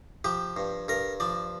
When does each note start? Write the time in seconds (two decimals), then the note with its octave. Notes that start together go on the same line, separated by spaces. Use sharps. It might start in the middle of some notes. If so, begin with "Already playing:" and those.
0.25 F3 G4
0.57 G2
0.88 G2 A#4
1.20 F3 D5